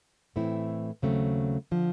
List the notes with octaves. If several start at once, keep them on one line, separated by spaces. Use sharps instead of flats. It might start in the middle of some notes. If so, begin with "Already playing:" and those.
A2 E3 A3 C4 E4
D#2 C#3 F#3 A3 C4
D3 F3